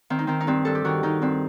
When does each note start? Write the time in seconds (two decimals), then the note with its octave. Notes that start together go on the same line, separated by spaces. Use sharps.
0.10 D#3 C4
0.19 D#4
0.27 D#3 C4
0.40 D#4
0.47 G2 C4
0.65 G2 A4
0.75 G4
0.85 D#3 F#4
1.03 D#3 D#4
1.22 G2 C4